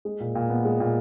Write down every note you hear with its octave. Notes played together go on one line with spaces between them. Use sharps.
G#3
A#2
A#2
B3
G#3
A#2